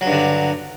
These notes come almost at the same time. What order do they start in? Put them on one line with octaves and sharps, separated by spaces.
F#3 G2 D3